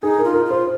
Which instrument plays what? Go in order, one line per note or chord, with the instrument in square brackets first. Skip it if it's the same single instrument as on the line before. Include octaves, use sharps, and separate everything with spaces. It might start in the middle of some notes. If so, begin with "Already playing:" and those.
[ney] D#4 [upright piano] G#4
[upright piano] A#4
[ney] F4
[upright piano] A#4
[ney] F4
[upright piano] C5